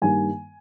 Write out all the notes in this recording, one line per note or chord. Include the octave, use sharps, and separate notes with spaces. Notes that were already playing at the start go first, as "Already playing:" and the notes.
G2 D#3 G3 A#3 G#5